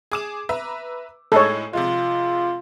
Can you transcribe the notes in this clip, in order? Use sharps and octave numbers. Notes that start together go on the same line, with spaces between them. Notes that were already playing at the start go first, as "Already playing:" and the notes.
G#4 D6 E7
B4 E5 A#5
A2 G#3 D#4 A4 C#5
C3 F3 G#3 F4